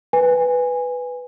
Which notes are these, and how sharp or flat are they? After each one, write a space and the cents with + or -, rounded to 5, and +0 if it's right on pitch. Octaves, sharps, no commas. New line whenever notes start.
B4 +5 G#5 -15